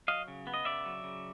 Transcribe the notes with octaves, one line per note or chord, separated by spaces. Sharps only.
F#3 D#5 F5
C#3
B3
D#5
C#3 D5 E5
F#3
C#3